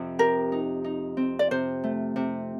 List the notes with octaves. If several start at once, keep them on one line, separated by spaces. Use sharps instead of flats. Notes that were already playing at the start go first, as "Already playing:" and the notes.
Already playing: F2 C3
G4 A#4
D#4
D#4
C4
D5
C3 C5
A3
C3